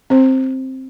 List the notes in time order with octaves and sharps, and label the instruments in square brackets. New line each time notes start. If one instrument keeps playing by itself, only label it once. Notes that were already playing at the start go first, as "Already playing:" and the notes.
[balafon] C4 C5